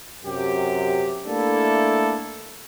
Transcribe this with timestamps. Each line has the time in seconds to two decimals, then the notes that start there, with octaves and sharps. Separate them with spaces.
0.24 F#2 C3 G4
1.26 A3 A#3 D4 E4 A4